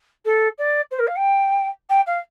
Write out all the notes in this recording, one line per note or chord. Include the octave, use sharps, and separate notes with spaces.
A4
D5
C5
A#4
F5
G5
G5
F5